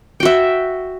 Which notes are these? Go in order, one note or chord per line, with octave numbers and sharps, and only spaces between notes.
F#4 E5 G5